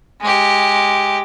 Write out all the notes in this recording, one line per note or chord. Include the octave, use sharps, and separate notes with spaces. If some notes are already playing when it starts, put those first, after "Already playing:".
G#3 G4